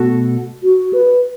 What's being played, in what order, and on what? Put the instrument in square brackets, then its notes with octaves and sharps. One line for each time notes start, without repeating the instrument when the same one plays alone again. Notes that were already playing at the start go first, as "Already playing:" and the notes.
Already playing: [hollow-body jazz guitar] B2 A3 F#4 A4
[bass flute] F#4
B4